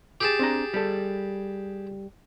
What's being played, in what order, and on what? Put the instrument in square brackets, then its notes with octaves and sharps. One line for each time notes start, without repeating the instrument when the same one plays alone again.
[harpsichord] G4 G#4 A5
[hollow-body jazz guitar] C4 D4 A#5
G3 A4